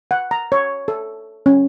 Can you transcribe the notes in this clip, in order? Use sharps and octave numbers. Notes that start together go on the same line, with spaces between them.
F#5
A#5
C#5
A4
C#4